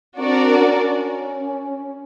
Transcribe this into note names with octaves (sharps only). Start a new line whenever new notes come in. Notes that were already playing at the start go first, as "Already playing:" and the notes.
C4 D4 F#4 A#4 D5
C#4